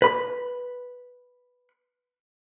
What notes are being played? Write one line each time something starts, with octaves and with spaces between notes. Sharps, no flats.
B4 B5